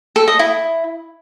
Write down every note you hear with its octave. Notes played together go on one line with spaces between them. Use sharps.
A4
D#5
E4